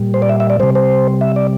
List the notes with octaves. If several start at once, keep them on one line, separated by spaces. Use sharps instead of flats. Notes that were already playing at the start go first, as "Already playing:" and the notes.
Already playing: A#2 G3
C5
D5
E5
E5
D5
C3 G3 C5
C5
E5
D5